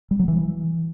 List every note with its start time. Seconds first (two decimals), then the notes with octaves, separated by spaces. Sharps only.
0.11 G3
0.19 F#3
0.28 E3